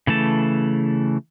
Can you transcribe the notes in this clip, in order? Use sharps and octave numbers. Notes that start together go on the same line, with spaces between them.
C#3 E3 A3 A5